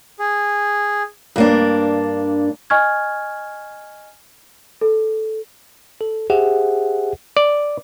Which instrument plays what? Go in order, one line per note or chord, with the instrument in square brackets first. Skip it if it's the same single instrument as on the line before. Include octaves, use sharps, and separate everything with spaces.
[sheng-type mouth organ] G#4
[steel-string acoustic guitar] G2 A#3 D4
[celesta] D#5 G#5 C#6 F6 G#6
A4
[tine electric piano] A4
G4 G#4 C5 E5 F#5
[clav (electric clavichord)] D5